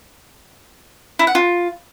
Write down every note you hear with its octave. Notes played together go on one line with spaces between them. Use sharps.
E4
F#5
F4